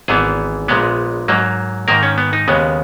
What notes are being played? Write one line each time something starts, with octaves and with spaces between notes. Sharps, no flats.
G#1 G#2 E3 B3 G#4
A#1 A#2 G#3 B3
G#2 F#3 A#3
G#2 D#3 A#3 A#4
C#4
B3
D#4
D#2 C#3 G#3 B3